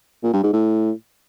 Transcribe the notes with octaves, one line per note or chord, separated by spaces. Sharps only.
A#2
G2
G#2
A2